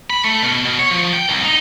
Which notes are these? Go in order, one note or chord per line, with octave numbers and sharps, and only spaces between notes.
B5
A3
B2
B2
C#5
F3
G5
C2
D#4